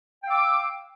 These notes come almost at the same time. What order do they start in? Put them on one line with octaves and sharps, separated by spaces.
G5 F5 E6 D6